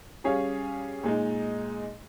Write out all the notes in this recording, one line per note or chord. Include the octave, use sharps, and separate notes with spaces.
G3 C#4 G#4 C#5 F5
A#2 G#3 D#4